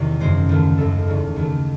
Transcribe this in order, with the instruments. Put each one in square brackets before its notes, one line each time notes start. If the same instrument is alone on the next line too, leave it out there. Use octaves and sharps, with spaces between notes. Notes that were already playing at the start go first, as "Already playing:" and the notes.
Already playing: [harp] E2 C3 D#3 C#5
G#1 F#2 C#3 G#3 C5
D#2 D#3 A3
G#1 F#2 D#3 A3 A4
E1 E2 C#3
D#2 D#3 A3